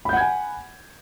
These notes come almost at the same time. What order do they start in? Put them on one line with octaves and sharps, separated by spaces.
B5 G6 F#5 G#6 G#5